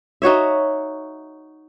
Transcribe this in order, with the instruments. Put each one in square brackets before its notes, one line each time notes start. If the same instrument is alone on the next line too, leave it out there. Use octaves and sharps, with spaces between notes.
[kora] D#4 F#4 C#5 E5